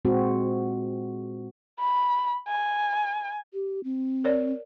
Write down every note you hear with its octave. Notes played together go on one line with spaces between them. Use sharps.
A#2 G#3 C4 F#4
B5
G#5
G4
C4
A#4 C#5 D5